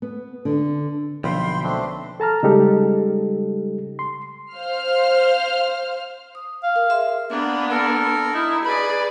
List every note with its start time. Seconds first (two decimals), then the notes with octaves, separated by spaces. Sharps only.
0.02 B3
0.45 D3
1.24 B1 D3 F3 A#3 G5 B5 C6
1.63 A3 C4 D4
2.20 A4 A5 A#5 F6
2.43 C#3 G3 G#3 D#4 G4 A4
3.99 C6
4.53 C5 F5 F6
6.35 D#6
6.63 F5
6.76 A#4
6.89 G#4 E5 C6
7.31 A#3 B3 D4
7.71 A4 A#4
8.33 D#4 E4
8.65 G#4 B4 D5 B5